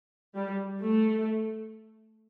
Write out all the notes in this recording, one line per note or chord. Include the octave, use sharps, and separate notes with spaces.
G3
A3